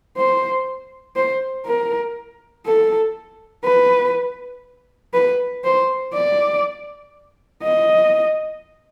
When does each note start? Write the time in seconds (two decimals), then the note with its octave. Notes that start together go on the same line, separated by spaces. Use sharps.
0.17 C5
1.16 C5
1.66 A#4
2.66 A4
3.64 B4
5.14 B4
5.64 C5
6.14 D5
7.63 D#5